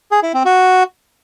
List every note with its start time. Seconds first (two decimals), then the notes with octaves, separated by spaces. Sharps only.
0.11 G#4
0.23 E4
0.34 C4
0.45 F#4